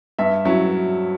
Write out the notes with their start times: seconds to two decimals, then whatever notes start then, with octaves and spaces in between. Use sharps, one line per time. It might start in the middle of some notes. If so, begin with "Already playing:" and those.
0.19 G2 E5
0.45 F#3 C#4 E4